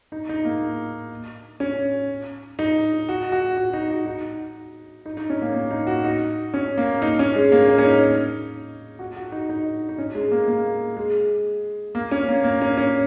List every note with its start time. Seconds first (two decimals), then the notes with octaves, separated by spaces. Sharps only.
0.12 D#4
0.29 D#4
0.45 A#3
1.60 C#4
2.59 D#4
3.09 F#4
3.32 F#4
3.57 F#4
3.73 D#4
3.90 F#4
4.06 D#4
5.06 D#4
5.17 D#4
5.30 C#4
5.42 A#3
5.54 A#3
5.71 D#4
5.87 F#4
6.04 D#4
6.54 C#4
6.78 A#3
7.02 D#4
7.19 C#4
7.36 G#3
7.52 A#3
7.68 C#4
7.78 C#4
7.85 D#4
8.99 F#4
9.16 F#4
9.32 D#4
9.49 D#4
9.89 D#4
9.98 C#4
10.15 G#3
10.32 A#3
10.48 A#3
10.97 G#3
11.95 A#3
12.11 C#4
12.28 A#3
12.44 A#3
12.62 C#4
12.77 C#4